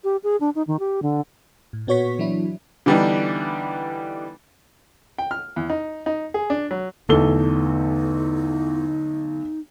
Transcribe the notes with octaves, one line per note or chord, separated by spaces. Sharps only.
G4
G#4
D4
D#4
D#3
G4
D3
A2
A#2 B3 F#4 C#5 C#6 B6
E3 F#3 D4 E4
D3 E3 G3 B3 D4 D#4
G5
F6
E2
D#4
D#4
G#4
D4
F#3
B1 E2 D3 A3 D#4 A4 G7